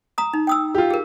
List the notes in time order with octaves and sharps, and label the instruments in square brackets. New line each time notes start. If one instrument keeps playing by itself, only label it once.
[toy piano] A#5 D#6
D#4
G5 D#6 E6
[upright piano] F4 G4
[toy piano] G#4 A#4